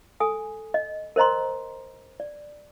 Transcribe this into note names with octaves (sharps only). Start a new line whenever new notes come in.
A4 G#5 D#6
D#5
A#4 C5 D#5 A#5 C6
D5